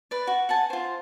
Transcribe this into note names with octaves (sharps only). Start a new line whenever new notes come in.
B4 D5
F#4
F#5 G#5 A5
F4 C5